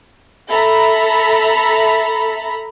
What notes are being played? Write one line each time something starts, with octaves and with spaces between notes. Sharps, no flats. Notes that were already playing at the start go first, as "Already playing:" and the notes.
A4 E5 A#5 B5